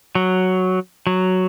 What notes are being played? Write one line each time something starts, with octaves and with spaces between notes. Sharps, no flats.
F#3
F#3